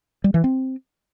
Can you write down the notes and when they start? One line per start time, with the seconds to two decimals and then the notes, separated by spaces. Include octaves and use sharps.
0.24 G3
0.34 E3
0.44 C4